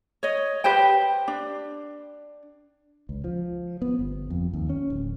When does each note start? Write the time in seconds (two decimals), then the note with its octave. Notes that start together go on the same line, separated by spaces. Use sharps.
0.23 C#5 D#5
0.64 G4 B4 C5 G5
1.28 D4
3.09 C#2
3.24 F3
3.82 B3
3.99 G1
4.30 F2
4.54 D#2
4.70 C#4
4.90 D1